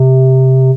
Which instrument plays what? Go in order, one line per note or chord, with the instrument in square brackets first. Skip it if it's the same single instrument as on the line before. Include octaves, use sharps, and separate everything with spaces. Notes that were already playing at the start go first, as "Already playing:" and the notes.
Already playing: [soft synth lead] C3